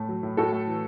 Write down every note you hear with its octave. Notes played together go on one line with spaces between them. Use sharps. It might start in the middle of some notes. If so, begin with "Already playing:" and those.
Already playing: A2 A3
F#3
A2
A2 F#4 A4
A3
E3